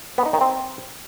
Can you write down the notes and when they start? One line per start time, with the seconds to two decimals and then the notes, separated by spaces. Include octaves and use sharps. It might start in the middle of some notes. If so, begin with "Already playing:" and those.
0.18 B3
0.26 D#4
0.33 D#3
0.41 C4